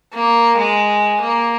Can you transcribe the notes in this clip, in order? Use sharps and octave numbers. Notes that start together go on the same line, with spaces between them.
A#3
G#3
A#3